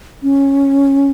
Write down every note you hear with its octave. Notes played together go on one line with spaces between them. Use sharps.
C#4